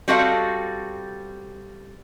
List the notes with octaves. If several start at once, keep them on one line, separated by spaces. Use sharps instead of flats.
G3 C4 F#4 A4 D#5 F5